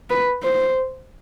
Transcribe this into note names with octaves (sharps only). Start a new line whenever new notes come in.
B4
C5